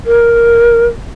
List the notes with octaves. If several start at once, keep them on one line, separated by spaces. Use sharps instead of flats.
A#4